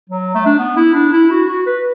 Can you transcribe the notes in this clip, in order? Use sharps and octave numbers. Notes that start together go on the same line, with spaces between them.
F#3
A3
D4
B3
E4
D4
E4
F#4
F#4
B4